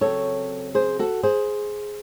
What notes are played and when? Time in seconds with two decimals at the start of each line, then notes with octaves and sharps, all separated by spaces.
0.01 C#3 F#3 C4 A4 C#5
0.75 G#4 C5
0.99 F#4 A4
1.23 G#4 C5